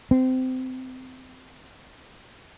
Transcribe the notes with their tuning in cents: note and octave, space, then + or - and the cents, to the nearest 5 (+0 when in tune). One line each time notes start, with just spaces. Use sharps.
C4 -20